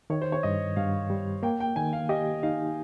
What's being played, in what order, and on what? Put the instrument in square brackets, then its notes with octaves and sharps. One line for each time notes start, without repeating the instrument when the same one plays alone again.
[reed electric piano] D#3 [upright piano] C#5
[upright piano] C5
C#5
[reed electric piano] G2 [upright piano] D#5
[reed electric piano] G2 [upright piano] F5
[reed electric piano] G3
[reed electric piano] A#3 [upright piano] G5
[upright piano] G5
[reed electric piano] D#3 [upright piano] G#5
[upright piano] F5
[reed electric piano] G4 [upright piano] D#5
[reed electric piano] D#4 [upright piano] F5